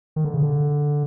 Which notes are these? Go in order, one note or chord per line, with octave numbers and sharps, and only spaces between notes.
D#3
D3
C#3
D3